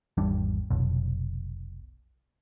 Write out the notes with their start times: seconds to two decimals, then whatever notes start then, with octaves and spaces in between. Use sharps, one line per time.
0.17 G#1 E2 G3 D4
0.71 F1 B1